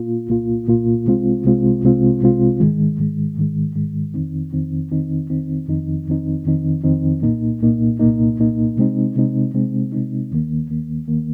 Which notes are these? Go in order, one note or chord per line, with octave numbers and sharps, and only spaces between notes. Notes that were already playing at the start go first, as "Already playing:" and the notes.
Already playing: A#2 A#3 F4
C2 A#2 A#3 F4
C2 A#2 A#3 F4
C2 C3 G#3 C4 F4
C2 C3 G#3 C4 F4
C2 C3 G#3 C4 F4
C2 C3 G#3 C4 F4
G#2 D#3 G#3
G#2 D#3 G#3
G#2 D#3 G#3
G#2 D#3 G#3
F2 D#3 C4 D#4
F2 D#3 C4 D#4
F2 D#3 C4 D#4
F2 D#3 C4 D#4
F2 D#3 C4 D#4
F2 D#3 C4 D#4
F2 D#3 C4 D#4
F2 D#3 C4 D#4
C2 A#2 A#3 D#4
C2 A#2 A#3 D#4
C2 A#2 A#3 D#4
C2 A#2 A#3 D#4
C3 G#3 C4 D#4
C3 G#3 C4 D#4
C3 G#3 C4 D#4
C3 G#3 C4 D#4
D#2 D#3 A#3
D#2 D#3 A#3
D#2 D#3 A#3